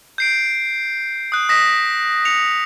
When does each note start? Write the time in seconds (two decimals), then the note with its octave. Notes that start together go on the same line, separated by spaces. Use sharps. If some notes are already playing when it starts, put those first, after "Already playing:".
0.18 G6 C7 D7
1.32 D#6 F#6
1.49 D#6 A#6 B6 E7
2.25 C#7 F7